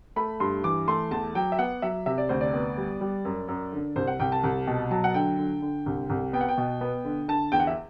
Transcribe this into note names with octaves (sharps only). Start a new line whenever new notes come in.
A3 B5
G2 C6
E3 D6
A3 C6
E2 A5
F#3 G5
E5
B3 F#5
F#3 E5
C3 E5
D5
D2 C5
D5
B3
G3
G3
F#2
F#2
D3
C2 C5
F#5
C2 G5
A5
C2
B2
F#3 A5
F#5
D3 G5
D3
D3
C2
C2
B3 G5
F#5
G5
B2
B3
D3
D3 A5
E2 G5
F#5
E5